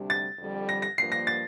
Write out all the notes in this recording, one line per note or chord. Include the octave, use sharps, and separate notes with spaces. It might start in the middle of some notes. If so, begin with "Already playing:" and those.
Already playing: D2 C3 G3 D4
A6
F2 D3 G3
A#6
A#6
G2 F3 A#3 D4 C7
A#6
A6